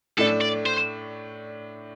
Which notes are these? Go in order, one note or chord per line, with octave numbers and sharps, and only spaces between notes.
A2 A3 D4 A4
D5
C5